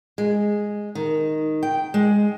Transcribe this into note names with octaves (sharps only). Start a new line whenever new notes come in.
G#3
D#3
G5
G#3